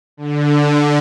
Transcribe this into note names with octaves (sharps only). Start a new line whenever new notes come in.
D3